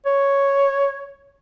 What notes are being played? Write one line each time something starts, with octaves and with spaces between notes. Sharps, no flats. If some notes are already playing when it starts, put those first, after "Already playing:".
C#5